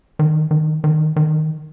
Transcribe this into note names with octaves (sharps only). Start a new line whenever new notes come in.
D#3
D#3
D#3
D#3